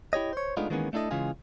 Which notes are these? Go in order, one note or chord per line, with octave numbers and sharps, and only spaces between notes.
E4 G4 C#5 D#5
C5 C#5
G#3 A3 B3 D4 D#4 F4
D#3 E3 G#3 A#3 B3 C#4
A3 D4 E4 A4 D#5
C#3 E3 G#3 F4 G#4